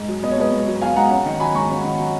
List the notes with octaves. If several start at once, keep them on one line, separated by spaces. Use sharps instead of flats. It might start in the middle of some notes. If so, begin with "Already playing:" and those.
Already playing: G#2 G#4
F#3
B3 D#5
C#5
G#2 B4 D#5
G#2
F#3
B3 F5 G#5
G#2 F#5 A#5
C#4
D#3
F#3 G#5 B5
G#2 A#5 C#6
C#4
D#3
F#3